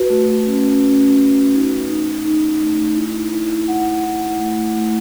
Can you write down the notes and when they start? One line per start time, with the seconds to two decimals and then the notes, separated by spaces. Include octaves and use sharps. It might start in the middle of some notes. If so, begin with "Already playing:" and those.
Already playing: F#4 B4
0.10 A3
0.46 C#4
0.81 C#4
1.17 A3
1.53 D#4
1.89 D#4
2.25 D#4
2.61 A3
2.97 E4
3.33 E4
3.68 F#5
4.04 E4
4.40 A3
4.76 A3